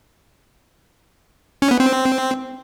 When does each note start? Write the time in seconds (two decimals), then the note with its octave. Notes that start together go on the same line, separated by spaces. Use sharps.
1.62 C#4
1.71 B3
1.80 C4